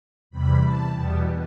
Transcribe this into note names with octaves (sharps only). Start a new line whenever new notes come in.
E2 C3 E3 G3 B5
A5
E2 B2 G3 B3